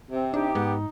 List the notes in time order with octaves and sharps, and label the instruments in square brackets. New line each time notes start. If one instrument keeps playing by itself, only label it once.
[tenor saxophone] C3 [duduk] C4
[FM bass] D4 [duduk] D#4 [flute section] G4
[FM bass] G#2 [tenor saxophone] B3